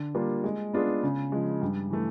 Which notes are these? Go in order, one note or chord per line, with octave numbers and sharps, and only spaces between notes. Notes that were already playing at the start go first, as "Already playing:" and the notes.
Already playing: D3
G3 A#3 D4 F4
G#3
B3 D4 F4 G#4
C#3
F3 G#3
G2
E3 A3